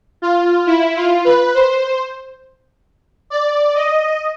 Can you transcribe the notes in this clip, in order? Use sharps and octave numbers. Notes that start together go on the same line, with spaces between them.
F4
E4
F4
B4
C5
D5
D#5